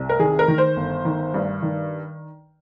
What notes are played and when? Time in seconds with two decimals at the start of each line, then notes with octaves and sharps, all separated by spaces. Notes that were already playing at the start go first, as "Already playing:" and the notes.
Already playing: C2
0.09 A#4
0.19 D#3 G#4
0.39 A#4
0.48 D#3
0.58 C5
0.76 G1
1.05 D#3
1.34 G2
1.62 D#3